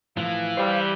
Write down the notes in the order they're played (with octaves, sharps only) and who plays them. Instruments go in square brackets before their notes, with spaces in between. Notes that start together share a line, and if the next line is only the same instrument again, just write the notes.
[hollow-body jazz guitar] A2 F3 [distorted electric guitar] E3 [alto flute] F5
[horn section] G3 [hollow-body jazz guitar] C5